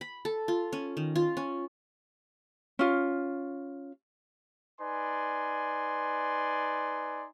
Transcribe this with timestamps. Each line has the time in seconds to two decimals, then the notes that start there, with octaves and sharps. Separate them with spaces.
0.01 B5
0.25 A4
0.48 F4
0.73 C#4
0.97 D#3
1.16 F4
1.37 C#4
2.79 C#4 F4
4.80 D#4 B4 D5 G#5 C6